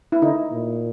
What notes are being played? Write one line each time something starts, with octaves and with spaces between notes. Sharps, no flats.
E4
D3 D#4
A#2